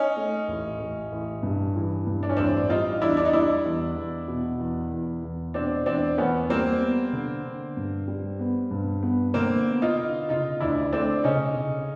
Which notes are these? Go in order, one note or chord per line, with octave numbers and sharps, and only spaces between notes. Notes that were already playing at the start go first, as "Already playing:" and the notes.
Already playing: C#4 D#4
A3
A1
A1
A1
G2
E3
G2
D4
C#4
A1 C4 D4
G3 D#4 F4
E2 D4 E4
D4
D#4
G3 D4 E4
E2
E2
B2
E2
E2
E2
B2 C4 D4
E2 C4 D4
E2 B3 C#4
G3 A#3 C4
B3
D3
D3
G2
G3
B3
G2
B3
D3 A#3 C4
B3
D#4 F4
D3
C#3 D#4 F4
D2 D4 E4
A3 C4 D4
C#3 C#4 D#4
C#3